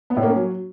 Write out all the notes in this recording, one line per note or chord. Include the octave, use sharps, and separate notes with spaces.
B3
A2
A#3
C#4
F#3